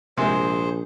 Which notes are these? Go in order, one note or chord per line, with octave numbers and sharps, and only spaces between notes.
A#1 C3 G#3 G#4 C5